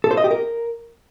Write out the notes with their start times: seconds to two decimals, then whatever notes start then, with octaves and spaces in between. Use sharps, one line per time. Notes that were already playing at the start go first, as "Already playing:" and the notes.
0.04 A4
0.11 C5
0.17 D#5
0.24 G4
0.31 A#4